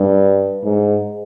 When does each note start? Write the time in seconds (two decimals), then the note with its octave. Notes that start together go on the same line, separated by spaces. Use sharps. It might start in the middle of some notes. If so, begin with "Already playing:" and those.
Already playing: G2
0.64 G#2